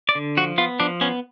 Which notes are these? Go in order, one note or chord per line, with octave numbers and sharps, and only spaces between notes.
D5
D3
F3 F#4
B3 F4
F3 D4
B3 C#4